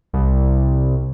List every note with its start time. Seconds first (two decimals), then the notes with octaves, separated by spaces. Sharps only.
0.13 C2